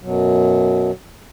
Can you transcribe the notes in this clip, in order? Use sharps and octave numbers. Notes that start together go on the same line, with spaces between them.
F#2 B2 F#3